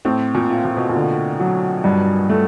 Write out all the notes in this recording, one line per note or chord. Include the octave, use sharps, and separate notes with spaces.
A2 C4
A#2
F4
A#2
B2
A#2
D3
F#3
G2
A3